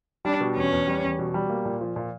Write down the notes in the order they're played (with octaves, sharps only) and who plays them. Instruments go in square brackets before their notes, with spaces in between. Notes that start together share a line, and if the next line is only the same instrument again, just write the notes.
[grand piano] G3 [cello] D4
[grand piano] B2
[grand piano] E2 [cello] C#4
[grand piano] E2
G3
E2
B2
G3
A#3
A#2
F3
A#2